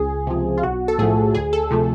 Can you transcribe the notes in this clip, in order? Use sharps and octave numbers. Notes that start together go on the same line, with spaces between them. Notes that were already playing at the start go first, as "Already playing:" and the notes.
Already playing: C#2 G#4
C3 F3
F4
B1 F#4
A4
A2 F3 A3 G#4
D2 G#4
A4
C3 F3 A3